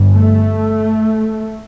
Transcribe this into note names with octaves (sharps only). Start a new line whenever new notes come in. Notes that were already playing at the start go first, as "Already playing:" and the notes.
Already playing: G1 G2
A3